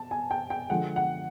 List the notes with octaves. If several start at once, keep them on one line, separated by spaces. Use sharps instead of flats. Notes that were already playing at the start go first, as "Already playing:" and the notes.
Already playing: A5
G#5
G5
G5
D3 F3 G#3 F#5
F#5